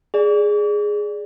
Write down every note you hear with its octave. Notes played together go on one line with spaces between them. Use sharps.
G#4 D5